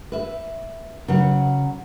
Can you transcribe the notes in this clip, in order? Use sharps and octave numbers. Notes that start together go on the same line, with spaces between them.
B4 E5
C#3 F#3 B4 F#5